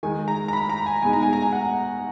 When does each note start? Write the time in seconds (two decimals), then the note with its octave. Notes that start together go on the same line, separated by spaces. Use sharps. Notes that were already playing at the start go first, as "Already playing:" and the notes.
0.03 D#3 G#3 D#4 G#5
0.28 A#5
0.48 A#5
0.53 B5
0.69 A#5
0.86 G#5
1.02 B2 G#3 D#4 G#5
1.13 A#5
1.23 G#5
1.33 A#5
1.42 G#5
1.53 F#5